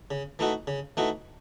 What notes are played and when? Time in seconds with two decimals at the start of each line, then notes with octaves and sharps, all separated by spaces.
0.11 C#3
0.39 E3 A3 D#4 F#4
0.67 C#3
0.97 E3 A3 D#4 F#4